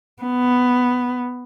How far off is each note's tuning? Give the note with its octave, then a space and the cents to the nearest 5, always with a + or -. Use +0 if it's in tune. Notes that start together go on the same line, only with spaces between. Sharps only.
B3 +5